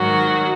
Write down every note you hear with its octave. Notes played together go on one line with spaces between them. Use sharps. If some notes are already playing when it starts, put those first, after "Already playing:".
Already playing: G#2 D#3 F#3 F#4